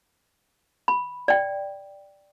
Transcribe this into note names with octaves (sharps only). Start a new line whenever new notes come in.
B5
D5 G5